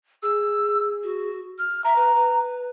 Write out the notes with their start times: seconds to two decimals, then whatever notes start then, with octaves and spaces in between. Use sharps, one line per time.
0.23 G#4 E6
1.03 F#4
1.58 F6
1.84 E5 A#5
1.96 B4
2.15 B4